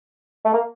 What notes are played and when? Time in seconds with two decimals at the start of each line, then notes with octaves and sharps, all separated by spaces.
0.45 A3
0.54 A#3